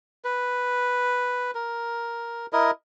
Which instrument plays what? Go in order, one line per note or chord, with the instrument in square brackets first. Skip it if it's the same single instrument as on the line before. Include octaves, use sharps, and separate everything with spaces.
[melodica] B4
A#4
E4 A#4 D#5